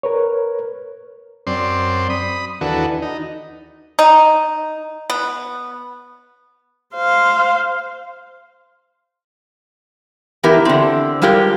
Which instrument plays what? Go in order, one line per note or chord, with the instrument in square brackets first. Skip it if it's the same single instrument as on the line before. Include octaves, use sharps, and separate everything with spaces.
[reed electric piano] A#4 B4 C#5
[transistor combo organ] F#2 C4 D5 C6
B5 D#6
D#2 E3 D4 F#4 A4 B4
D#4
[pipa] D#4
B3
[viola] C5 F5
[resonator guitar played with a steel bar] E3 B3 E4 G4 A#4
D3 C4
G3 G#3 F4 G4 A#4